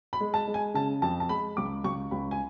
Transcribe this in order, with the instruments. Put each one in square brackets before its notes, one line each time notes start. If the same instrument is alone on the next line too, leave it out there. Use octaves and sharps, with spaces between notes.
[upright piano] B5
G#3
A5
G#3
G#5
C#3 A5
F2 A5
A5
G#3 B5
C#2 D6
C#2 C#6
C#2 B5
G#5